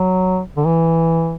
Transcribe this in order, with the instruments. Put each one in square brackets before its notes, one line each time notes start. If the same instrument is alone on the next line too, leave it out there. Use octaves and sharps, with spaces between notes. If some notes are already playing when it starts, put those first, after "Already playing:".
Already playing: [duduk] F#3
D3
E3